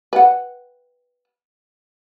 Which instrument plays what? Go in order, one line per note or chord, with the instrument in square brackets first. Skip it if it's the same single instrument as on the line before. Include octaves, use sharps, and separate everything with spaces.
[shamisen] B4 F#5